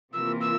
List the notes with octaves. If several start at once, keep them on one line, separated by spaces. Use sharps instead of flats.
C3 E3 A#3 F4 A#4 E6
E6